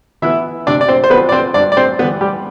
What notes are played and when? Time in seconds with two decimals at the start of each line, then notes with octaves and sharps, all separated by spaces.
0.22 E3 B3 E4 E5
0.67 C3 D4 D5
0.81 D5
0.88 C4 C5
1.04 C5
1.10 F3 B3 C4 B4
1.29 D5
1.32 C4 C5
1.54 G2 D4 D5
1.72 D5
1.77 C4 C5
1.99 E3 G3 B3 B4
2.21 G3 G4